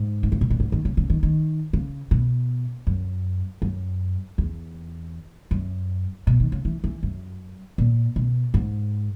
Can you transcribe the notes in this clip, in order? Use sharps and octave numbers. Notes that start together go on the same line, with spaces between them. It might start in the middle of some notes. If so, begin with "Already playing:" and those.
Already playing: G#2
D#3
C#3
B2
A#2
G#2
D#3
C#3
C#3
D#3
D#3
C#3
B2
F#2
F#2
E2
F#2
B2
D#3
C#3
E3
E3
F#2
A#2
B2
G#2